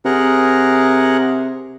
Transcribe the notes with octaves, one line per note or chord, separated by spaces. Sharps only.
C3 G#4 A#4 F#5